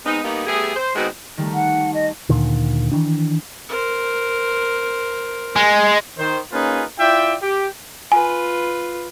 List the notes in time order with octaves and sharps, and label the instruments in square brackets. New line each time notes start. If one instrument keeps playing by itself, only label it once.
[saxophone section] G#3 B3 C4 D#4
G3 A#3 B3 D#4
G3 A3 B3 G#4
C5
D#3 G#3 B3 C4 F#4 D#5
[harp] D#3 G3 A3
[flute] F#5
D#5
[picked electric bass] D2 A#2 D3 D#3
D#3 E3 D4
[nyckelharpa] A#4 C5
[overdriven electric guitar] G#3
[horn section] D#3 C5
A#3 C#4 D#4 F4 G#4 B4
E4 F4 D5 E5 G5
G4
[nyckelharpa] F4 B4 [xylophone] G#5